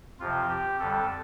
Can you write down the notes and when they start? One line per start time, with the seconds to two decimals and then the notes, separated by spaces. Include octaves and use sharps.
0.20 F2 C3 F3 F4
0.49 G4
0.79 F2 D3 G3 A4